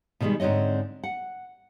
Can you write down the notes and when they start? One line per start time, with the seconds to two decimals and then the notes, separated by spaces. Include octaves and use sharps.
0.20 B2 D3 D#3 G3 G#3
0.40 G#2 D3 C4 C#5 D#5
1.03 F#5